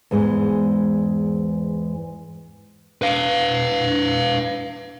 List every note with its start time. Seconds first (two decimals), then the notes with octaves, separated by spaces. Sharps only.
0.11 E2 G#2 E3 G#3
3.02 B4 F5